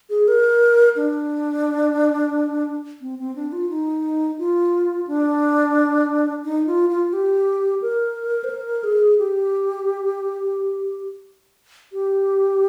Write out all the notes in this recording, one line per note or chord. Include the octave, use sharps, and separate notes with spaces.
G#4
A#4
D4
C4
C4
D4
F4
D#4
F4
D4
D#4
F4
F4
G4
A#4
C5
A#4
G#4
G4
G4